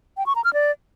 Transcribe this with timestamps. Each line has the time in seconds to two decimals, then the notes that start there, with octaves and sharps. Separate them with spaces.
0.17 G5
0.26 C#6
0.35 A#5
0.44 F6
0.53 D5